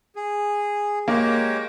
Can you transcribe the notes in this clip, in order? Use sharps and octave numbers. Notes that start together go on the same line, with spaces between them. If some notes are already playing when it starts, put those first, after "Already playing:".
G#4
G#3 A#3 G4 C#5